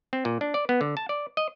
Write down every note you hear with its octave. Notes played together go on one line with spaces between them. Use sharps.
C4
A#2
D4
D5
B3
D3
A5
D5
D#5